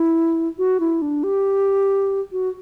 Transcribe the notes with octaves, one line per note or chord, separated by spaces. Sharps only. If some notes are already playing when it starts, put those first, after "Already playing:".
Already playing: E4
F#4
E4
D4
G4
F#4